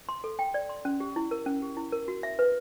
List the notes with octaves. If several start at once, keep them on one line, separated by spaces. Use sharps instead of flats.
C6
A4
G5
D5
C6
C#4
G4
E4
A#4
C#4
G4
E4
A#4
F#4
E5
B4